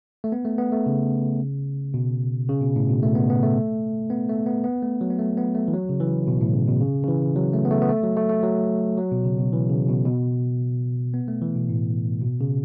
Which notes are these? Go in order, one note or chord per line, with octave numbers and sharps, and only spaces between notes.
A3
B3
A3
B3
A3
C#3
B2
C#3
B2
A2
B2
A3
B3
B3
A3
B3
A3
B3
B3
A3
F#3
B3
A3
B3
A3
E3
F#3
C#3
E3
B2
A2
C#3
B2
C#3
C#3
E3
F#3
A3
B3
A3
B3
A3
F#3
A3
A3
F#3
F#3
B2
C#3
B2
E3
C#3
B2
B2
B3
A3
E3
B2
A2
B2
C#3